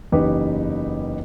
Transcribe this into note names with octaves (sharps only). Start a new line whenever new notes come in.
F#1 E2 C#4 D#4 G4 B4